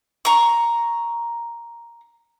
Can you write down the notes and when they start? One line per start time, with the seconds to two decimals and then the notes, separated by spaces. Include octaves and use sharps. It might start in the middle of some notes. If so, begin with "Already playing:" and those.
0.25 A#5 C#6